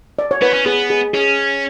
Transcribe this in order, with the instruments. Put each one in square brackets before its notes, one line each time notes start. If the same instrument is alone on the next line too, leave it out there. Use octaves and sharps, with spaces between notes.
[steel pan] D5
C#5
[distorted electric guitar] B3 [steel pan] B4
[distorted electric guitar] C#4
[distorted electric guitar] B3 [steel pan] G#4
[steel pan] G#4
[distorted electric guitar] C#4 [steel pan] G#4